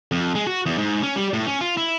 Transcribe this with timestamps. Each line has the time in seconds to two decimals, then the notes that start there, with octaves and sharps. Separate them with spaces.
0.12 F2
0.35 G#3
0.47 F#4
0.66 E2
0.78 G#2
1.03 C#4
1.16 G3
1.34 A2
1.47 C#4
1.61 F4
1.77 E4